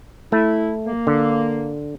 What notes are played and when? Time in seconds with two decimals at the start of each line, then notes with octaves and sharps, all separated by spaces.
0.32 A3 E4
0.86 A#3
1.07 D3